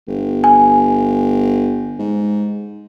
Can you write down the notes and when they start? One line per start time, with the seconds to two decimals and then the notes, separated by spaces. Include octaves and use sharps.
0.08 G1
0.44 G#5
1.99 G#2